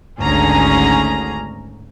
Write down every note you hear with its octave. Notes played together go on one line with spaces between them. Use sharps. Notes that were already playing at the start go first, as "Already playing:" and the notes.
G#1 D2 C#4 G#4 A#5